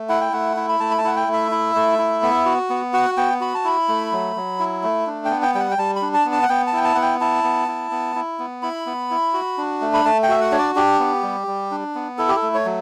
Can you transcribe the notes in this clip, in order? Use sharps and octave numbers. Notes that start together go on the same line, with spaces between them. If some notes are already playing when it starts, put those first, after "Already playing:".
Already playing: A3
E4 F#5
G5
A3 F#5
E4
B5
A3 A5
B5
A5
E4 F#5
G5
A3
E5
E4
A3
E4
B3
F#4
B3
F#4 F#5
B3 G5
F#4 B5
A5
E4 B5
A3
F#3
F#3
E4
A3
D4
G5
B3
G5
G3 G5
F#5
G5
G3 A5
B5
D4
A5
B3
A5
F#5
B3 G5
A5
E4 G5
A5
B3 F#5
G5
E4 A5
B3
E4
B3
E4
B3
E4 B5
B3
E4
F#4
D4
A3
B5
A3 A5
G5
F#4 E5
F#5
D4 C#5
D5
D4 G4
B3
G3
G3
D4
B3
E4 A4
G4
A4
A3
C#5
F#3